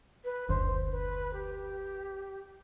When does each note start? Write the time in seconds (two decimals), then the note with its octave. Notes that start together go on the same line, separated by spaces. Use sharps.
0.24 B4
0.49 F#1 D2 C5
0.91 B4
1.33 G4